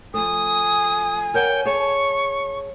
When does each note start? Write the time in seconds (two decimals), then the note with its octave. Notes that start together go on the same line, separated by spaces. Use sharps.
0.14 F3 A3 G#5 D#6
1.34 A#4 C#5 F#5 G5
1.65 G#4 C#5 A5 C#6